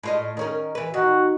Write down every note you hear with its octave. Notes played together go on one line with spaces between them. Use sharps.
A2 F4 D#5
D#3 C#4 A#4
E3 B4
D#3 F#4